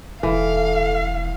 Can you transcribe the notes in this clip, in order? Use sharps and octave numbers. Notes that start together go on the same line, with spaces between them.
E1 E3 A4 F5